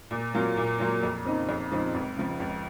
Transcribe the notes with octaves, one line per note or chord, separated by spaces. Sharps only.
A#2
F#3 A#3 F4
A#2
F#3 A#3 F4
F2
C#3 F3 C4 D#4
F2
C#3 F3 C4 D#4
C#2
C#3 F3
C#2